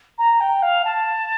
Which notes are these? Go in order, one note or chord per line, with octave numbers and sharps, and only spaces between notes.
A#5
G5
F5
A5